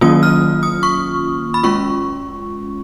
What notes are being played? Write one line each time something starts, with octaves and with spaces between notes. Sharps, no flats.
D#3 F#3 A#3 C#4 F4 D#6
F6
D#6
C#6
B5
G#3 C#4 F4 C#6